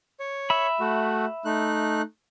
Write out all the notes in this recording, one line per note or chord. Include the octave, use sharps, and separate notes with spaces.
C#5
E5 B5
A3 F#4
A3 D#4 F#6